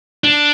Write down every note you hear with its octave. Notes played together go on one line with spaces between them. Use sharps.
D4